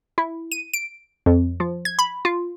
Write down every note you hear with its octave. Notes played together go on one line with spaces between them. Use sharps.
E4
D#7
D7
F2
F3
G#6
B5
F4